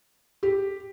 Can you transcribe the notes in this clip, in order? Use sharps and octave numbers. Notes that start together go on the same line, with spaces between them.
G4